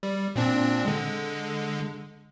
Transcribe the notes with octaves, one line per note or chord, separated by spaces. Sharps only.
G3
A#2 C4 D4
D3 G#3